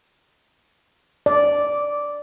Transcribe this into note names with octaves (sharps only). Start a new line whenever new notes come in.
D5